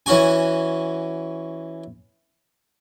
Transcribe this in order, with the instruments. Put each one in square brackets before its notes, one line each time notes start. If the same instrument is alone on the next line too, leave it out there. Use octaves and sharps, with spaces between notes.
[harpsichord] E3 C#4 F#4 G#5